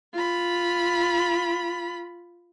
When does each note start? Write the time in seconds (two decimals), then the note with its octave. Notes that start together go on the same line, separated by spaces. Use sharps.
0.14 F4 B5